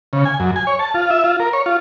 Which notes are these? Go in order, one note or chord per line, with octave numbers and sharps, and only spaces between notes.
C#3
G#5
F#2
G#5
C#5
A5
F4
E5
F4
A#4
C#5
F4